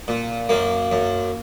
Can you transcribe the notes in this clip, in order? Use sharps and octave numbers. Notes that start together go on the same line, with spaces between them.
A#2
F#2 A#3
F#2